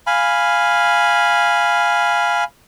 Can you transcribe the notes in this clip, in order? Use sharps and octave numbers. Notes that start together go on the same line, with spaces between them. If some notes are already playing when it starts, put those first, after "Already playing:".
F5 G#5 B5